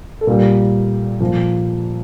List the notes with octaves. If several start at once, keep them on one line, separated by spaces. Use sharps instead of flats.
A4
A#2 G3 A#4
A#2 F3